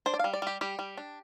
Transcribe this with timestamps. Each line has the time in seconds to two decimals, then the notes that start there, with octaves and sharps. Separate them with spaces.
0.06 D4 C5
0.14 D5
0.19 F5
0.24 G3
0.33 D5
0.42 G3 G4
0.61 G3 G4
0.79 G3
0.97 D4